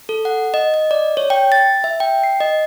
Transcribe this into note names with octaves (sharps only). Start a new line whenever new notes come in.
A4
F#5
D#5
D#5
D5
C#5
G5
A6
E5
G5
C7
D#5